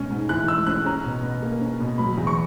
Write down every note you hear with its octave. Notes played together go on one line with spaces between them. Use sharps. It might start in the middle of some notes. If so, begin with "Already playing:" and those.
Already playing: B2 G#3 C#4
G#2
E3 F#6
G#3 E6
C#4 F#6
C#4 A#5
B2
B2
A#3
C#4
B2
F#3 B5
E2
C#6